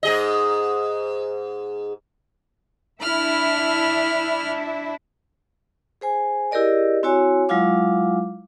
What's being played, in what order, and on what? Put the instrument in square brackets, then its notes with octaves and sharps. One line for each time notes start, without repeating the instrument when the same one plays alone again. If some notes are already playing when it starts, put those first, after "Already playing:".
[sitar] G#2 G#4 D#5
[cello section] D4 E4 E5 [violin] B5 F6
[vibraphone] G#4 C5 G#5
E4 G4 G#4 A#4 D5 D#5
C4 E4 F#4 C#5 G#5
F#3 G#3 E4 F4 F5 D6